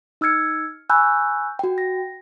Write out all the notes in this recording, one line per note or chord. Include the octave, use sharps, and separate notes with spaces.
D#4 E6 F6 G#6 C#7
G#5 B5 C#6 E6 F#6 G6
F#4 G5
A#6